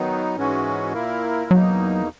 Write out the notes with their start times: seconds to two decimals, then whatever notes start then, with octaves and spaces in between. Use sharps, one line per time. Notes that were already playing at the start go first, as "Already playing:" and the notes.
Already playing: D#3 F#3 B3 D#4
0.36 G#2 E3 G#3 C#4 F#4
0.93 A#2 A#3 E4 A#4
1.51 E2 B2 F#3 A#3 D#4